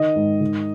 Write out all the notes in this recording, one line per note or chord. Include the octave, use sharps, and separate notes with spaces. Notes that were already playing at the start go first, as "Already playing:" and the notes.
Already playing: D#3 D#5
G#2
D#3